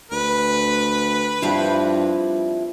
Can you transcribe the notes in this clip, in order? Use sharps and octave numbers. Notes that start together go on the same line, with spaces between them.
D2 B4
G2 F3 C4 E4